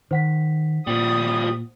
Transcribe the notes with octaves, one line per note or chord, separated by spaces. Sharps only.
D#3 C5 F#5 B6
A#2 F3 G3 D#6